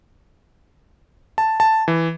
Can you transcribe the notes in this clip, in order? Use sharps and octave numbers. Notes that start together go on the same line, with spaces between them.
A5
A5
E3